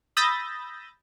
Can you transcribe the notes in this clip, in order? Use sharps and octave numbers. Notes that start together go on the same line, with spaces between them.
B5 D#6 E6 G6 A6 A#6